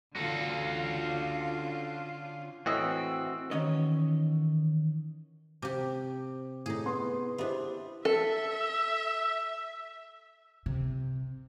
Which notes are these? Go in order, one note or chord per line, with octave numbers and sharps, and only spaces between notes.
D3 C#4 F4 F#4 A4
A2 E3 C4 F#4 D#5 E6
D#3 E3 C#4 F#4 C#5 D#5
C3 G4 D6
A2 D#4 G#4
B3 C6
B3 D4 E4 G4 C5
A4 E5
C3